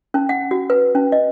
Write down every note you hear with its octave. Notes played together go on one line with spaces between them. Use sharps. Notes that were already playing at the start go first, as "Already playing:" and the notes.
C#4
F#5
F#4
B4
C#4
D#5